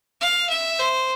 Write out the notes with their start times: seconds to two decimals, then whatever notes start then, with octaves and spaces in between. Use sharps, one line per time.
0.21 F5
0.49 E5
0.79 C5